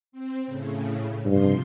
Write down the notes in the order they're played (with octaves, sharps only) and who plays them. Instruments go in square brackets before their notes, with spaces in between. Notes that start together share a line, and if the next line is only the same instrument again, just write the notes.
[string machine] C4
A2 C#3
[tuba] G2 [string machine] C3 F3 C6